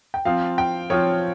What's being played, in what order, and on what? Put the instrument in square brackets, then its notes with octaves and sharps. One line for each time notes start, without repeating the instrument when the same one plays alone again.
[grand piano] G5
[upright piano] F3 C4 F4 [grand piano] F5
[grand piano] G5
[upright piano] F3 C4 F4 [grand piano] C#5